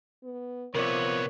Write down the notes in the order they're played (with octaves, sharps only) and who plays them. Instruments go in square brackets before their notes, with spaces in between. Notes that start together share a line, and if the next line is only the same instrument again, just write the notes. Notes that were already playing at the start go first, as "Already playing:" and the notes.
[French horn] B3
[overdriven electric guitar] C3 B3 [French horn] F3 [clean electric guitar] A#4 D5 [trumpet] C#5